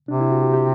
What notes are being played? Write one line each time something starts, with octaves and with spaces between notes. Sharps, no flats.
C3 D4
E4
F#4
G4
G4